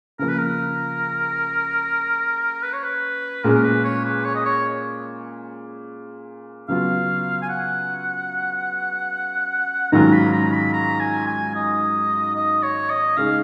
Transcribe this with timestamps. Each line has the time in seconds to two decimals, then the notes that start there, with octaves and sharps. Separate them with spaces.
0.19 C#3 F3 A#3 A#4
0.28 B4
0.38 A#4
2.63 B4
2.73 C#5
2.84 B4
3.44 A#2 G#3 C#4 G#4 A#4
3.55 A#4
3.64 B4
3.85 C#5
4.05 B4
4.24 C#5
4.35 D#5
4.46 C#5
6.68 C#3 F#3 B3 F4 F5
7.42 G#5
7.49 F#5
9.92 G#2 D#3 F#3 C#4 F4 A#5
10.12 B5
10.33 A#5
10.53 B5
10.73 A#5
11.00 G#5
11.27 G#5
11.55 D#5
12.36 D#5
12.63 C#5
12.90 D#5
13.17 C#3 G#3 D#4 F5